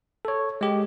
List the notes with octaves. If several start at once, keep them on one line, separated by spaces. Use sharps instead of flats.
A4 C#5
G#3 G4